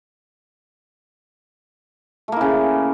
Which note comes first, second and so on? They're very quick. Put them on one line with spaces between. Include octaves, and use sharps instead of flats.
A3 A#3 E4 C#3